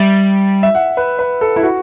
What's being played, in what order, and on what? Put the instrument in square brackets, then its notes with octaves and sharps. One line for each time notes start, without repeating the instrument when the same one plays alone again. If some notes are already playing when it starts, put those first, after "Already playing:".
Already playing: [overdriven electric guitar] G3 [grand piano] E5
[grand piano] E5
F#5
B4
B4
A4
E4
F#4